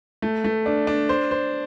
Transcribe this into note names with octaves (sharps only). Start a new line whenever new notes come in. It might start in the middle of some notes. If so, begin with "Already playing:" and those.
A3
A3
D4
D4
C5
C5